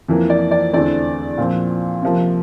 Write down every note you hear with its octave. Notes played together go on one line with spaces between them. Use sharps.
F2 E3 A#3
D5
D5
E2 D3 A3 C4 D5
A#2 F3 C4
C3 F3 A#3